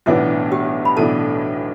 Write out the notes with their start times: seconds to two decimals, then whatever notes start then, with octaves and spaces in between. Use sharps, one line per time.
0.06 B1 A2 E3 B3 D4 E4 E5
0.52 G4 G5
0.85 B5
0.97 B1 A2 E3 B3 D4 A4 A5